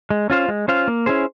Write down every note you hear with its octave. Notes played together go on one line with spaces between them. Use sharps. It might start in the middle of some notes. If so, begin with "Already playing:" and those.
G#3
C#4 F4 C5 F5
G#3
C#4 F4 C5 F5
A#3
C#4 E4 G#4 C5